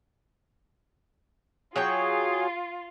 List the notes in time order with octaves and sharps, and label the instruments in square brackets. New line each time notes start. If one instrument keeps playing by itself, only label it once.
[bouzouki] F#3 C#5 G5 [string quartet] F4 [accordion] G#4